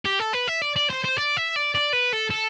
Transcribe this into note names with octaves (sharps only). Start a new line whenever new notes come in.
G4
A4
B4
E5
D5
D5
C5
C5
D5
E5
D5
D5
B4
A4
A4